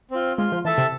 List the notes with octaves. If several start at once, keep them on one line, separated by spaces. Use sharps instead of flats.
C4 F4
G#3 F4
F3
E3 A4 E5 A5
C3